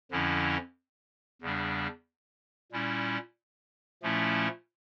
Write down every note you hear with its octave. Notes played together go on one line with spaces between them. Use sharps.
F2 D3 F3 C#4 E4
E2 C#3 G3 D4
A#2 G3 C#4 E4
A#2 F3 A3 C#4 E4